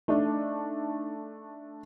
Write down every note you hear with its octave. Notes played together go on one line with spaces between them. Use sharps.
A3 D4 D#4